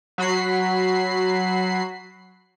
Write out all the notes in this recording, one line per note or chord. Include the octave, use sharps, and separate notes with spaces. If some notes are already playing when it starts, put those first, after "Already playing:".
F#3 F#4 B5 C7